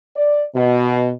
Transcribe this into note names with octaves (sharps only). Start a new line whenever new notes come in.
D5
B2